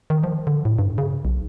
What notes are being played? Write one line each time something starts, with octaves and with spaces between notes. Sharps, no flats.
D#3
F3
D3
A2
G2
C#3
B1